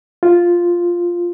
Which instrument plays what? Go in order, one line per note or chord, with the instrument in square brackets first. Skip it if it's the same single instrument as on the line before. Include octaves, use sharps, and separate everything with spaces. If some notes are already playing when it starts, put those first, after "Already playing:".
[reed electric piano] F4